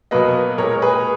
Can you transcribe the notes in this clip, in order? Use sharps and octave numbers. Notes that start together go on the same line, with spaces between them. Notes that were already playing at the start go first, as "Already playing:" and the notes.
B2 F#3 A#3 B4 D#5
A#2 G#3 A#4 C#5
G#4 B4